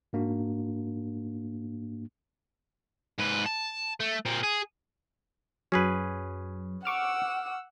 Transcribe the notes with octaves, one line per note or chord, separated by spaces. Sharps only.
G#2 A#3 D4 F#4
G#2 B4
A5
A3
A#2 C4
G#4
F#2 F#3 C#4 G#4 B4
F#5 C#6 D6 E6 F6